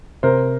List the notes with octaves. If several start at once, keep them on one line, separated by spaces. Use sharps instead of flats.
C3 A#4 C5